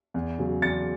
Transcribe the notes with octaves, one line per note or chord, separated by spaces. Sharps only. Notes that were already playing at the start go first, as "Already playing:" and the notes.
E2
C#3 F#3
E2 A6 C#7